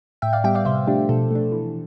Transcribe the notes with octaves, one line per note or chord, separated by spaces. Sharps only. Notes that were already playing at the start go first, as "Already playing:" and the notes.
A2 E5 G5
D5 F5
G3 B3 E5 G5
D5 F5
C3 C5 E5
F3 A3 D4 G4
B2 A4
A3 D4
E3